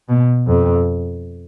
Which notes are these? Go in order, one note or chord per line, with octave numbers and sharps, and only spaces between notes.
B2
F2